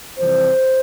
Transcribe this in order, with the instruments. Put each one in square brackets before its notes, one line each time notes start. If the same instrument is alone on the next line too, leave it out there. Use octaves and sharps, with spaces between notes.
[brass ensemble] F2 C3 E3 G3 C5